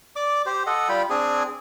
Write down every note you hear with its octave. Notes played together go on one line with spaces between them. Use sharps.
D5 D6
G4 C5
A4 D#5 F#5
G3 F4 G5 B5
C4 D4 G#4 G#5